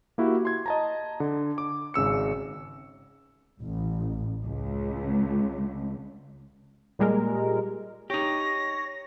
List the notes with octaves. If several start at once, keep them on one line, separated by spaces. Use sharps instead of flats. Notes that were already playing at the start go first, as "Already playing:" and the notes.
A#3 E4 F#4 G4
C6 G#6
D#5 A5 A#5
D3
D6
G#1 C#3 E6 C#7
A1
C#2
A#2 G3 G#3 A#4
D#4 G4 C#5 A#6